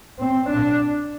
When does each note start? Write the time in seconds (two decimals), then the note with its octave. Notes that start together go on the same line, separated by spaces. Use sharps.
0.19 C4
0.50 D4